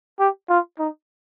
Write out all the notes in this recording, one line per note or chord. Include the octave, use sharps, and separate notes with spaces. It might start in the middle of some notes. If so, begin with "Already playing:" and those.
G4
F4
D#4